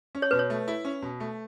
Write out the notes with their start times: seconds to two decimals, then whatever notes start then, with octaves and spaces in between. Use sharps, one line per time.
0.15 C#4
0.22 C#5
0.31 B2 B4
0.39 C#5
0.50 A3
0.68 E4
0.85 C#4
1.02 B2
1.20 A3